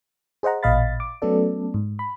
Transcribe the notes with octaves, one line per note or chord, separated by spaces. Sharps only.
G#4 C5 D#5 F#5 A#5
A1 A#2 D#5 F5 B5 A6
D6
F#3 A3 B3 C#4 A4 D5
G#2
B5